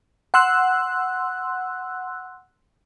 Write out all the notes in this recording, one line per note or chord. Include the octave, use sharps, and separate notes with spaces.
F#5 C6 E6 F#6